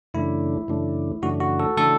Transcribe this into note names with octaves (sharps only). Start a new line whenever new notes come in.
F#2 C#3 E3 A3 D4 E4
F#2 C#3 E3 A3 D4
F#2 C#3 E3 A3 D4 F#4
F#4
A4
C#3 E3 A3 D4 A4